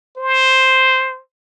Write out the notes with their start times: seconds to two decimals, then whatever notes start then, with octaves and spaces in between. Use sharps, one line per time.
0.18 C5